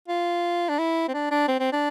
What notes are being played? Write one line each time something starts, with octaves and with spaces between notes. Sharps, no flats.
F4
D4
E4
C4
D4
D4
C4
C4
D4